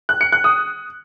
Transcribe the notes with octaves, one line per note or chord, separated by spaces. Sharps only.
F#6
C#7
F#6
D#6